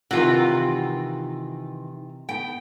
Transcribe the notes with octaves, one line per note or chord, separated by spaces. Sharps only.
C3 D#3 E3 F4 F#5
B3 G5